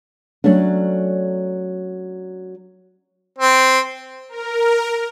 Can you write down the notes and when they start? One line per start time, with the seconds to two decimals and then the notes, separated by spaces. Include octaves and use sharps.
0.44 F#3 A3 C#4 D4
3.38 C4
4.29 A#4